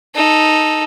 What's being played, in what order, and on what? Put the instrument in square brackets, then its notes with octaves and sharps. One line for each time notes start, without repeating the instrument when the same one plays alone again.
[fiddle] D#4 A4